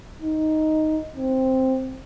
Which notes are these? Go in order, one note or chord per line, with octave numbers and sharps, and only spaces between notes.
D#4
C4